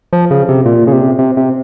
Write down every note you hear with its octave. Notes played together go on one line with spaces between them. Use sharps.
F3
C#3
C3
A#2
C#3
C3
C3
C3